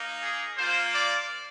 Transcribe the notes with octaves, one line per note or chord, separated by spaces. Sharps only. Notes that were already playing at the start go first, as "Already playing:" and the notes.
Already playing: A#3 D#4
G#4
A#3 F4 C5
D5